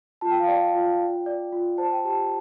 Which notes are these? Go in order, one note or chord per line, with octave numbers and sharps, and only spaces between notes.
F4 A5
G5
F5
D5 G5
F4
F4
D5
F4
C5 A5
G5
G4 A5